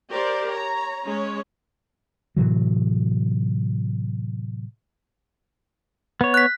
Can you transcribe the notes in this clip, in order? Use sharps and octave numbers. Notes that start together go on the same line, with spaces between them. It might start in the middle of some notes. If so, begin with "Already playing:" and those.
G4 A#4 C5 D5
C#5 A#5
G#3 C#4 C#5
A2 C3 E3 F#3
B3 C#5
F#6 B6